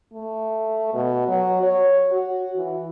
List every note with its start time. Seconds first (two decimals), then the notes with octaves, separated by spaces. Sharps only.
0.14 A3
0.94 B2
1.28 F#3
1.63 C#5
2.12 F#4
2.57 E3